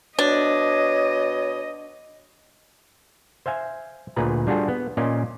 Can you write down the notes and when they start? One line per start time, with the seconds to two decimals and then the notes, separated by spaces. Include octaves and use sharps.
0.19 B2 D4 C#5 D#5
3.46 C5 E5 F5 G#5
4.16 D2 A#2 G#4 B4 A#5
4.47 G3 D4 F4 F#4 G#4 A4
4.68 B3
4.97 A#2 C#4 F4 D5 D#5